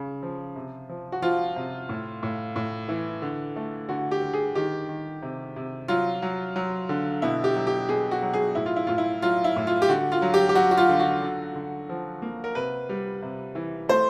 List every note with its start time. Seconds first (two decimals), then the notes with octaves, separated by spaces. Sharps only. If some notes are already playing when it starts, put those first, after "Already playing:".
Already playing: C#3
0.23 F3
0.56 C3
0.89 F3
1.12 F#4
1.22 F3 F4
1.56 C3
1.89 A2
2.23 A2
2.56 A2
2.88 E3
3.22 D3
3.56 A3
3.89 D3 F#4
4.11 G4
4.22 D3
4.33 G#4
4.55 D#3 G4
4.88 D#3
5.22 C3
5.56 C3
5.88 F#3 F4
6.22 F#3
6.56 F#3
6.89 D3
7.22 B2 E4
7.44 G4
7.56 F#3
7.67 G4
7.89 B2 G#4
8.11 F#4
8.22 F#3
8.34 G#4
8.55 A2 E4
8.66 F4
8.76 E4
8.87 A2 F4
8.98 E4
9.22 F#3 F4
9.44 E4
9.56 A2
9.67 F4
9.82 G4
9.89 D3 F#4
10.12 F4
10.22 F#3
10.34 G4
10.49 G4
10.55 F#3 F#4
10.71 F#4
10.77 F4
10.89 D3
11.00 F#4
11.22 D3
11.55 D3
11.89 F3
12.22 A#3
12.44 A#4
12.55 C3 B4
12.89 G3
13.22 C3
13.55 E3
13.89 A3 C5